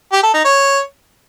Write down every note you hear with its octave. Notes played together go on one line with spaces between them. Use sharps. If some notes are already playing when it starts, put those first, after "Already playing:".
G4
A4
D#4
C#5